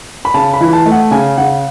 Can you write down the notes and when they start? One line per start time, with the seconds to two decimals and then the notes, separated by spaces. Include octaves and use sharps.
0.25 B5
0.34 C#3 A5
0.54 B5
0.61 E3
0.73 A5
0.86 A3
0.92 F#5
1.11 C#3 G#5
1.37 C#3 F#5